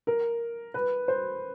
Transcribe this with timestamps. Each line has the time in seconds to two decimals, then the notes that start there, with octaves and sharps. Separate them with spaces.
0.07 A#4
0.74 B4
1.08 C5